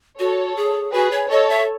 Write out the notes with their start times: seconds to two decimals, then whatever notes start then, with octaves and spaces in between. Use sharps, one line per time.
0.19 F#4 A4 C#5
0.57 G#4
0.93 F#4 G#4 B4
1.11 C#5
1.30 A4 C#5 D#5
1.49 E5